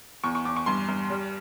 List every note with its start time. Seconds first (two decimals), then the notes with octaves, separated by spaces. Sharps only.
0.24 E2 C#6
0.35 C#6
0.45 E2 D6
0.56 C#6
0.66 G2 C6
0.89 G2
1.10 G3